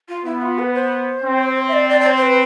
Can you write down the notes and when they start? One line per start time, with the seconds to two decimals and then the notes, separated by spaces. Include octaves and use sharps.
0.09 F4
0.25 B3 E4
0.42 F4
0.59 B4
0.75 C5
1.24 C4
1.68 E5
1.73 D5
1.90 D5
2.00 D5
2.07 C5
2.17 C5
2.23 B4